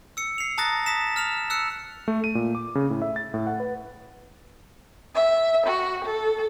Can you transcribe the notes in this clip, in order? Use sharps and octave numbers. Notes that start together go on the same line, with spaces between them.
E6 C#7
C7 F7
A5 A#5 D#6 F#6 A6 A#6
D#6 A#6 B6 E7
F6 E7 F7
E6 F#6 C#7
A3
D#7
A#2
D6
C#3
A2
E5
A6
A2
F#5
B4
E5
F#4
A4